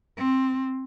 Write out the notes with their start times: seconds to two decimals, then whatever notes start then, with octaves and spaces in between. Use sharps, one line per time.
0.17 C4